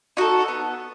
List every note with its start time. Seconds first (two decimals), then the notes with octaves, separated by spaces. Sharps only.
0.17 D#4 F#4 A4
0.48 B3